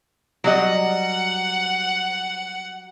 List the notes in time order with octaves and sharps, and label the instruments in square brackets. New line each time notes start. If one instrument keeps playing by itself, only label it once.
[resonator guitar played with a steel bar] F#3 G3 D#5 [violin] F#5